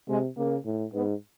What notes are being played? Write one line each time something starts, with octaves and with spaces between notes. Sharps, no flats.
C3 G#3
C#3 A#3
A2
G#2 B3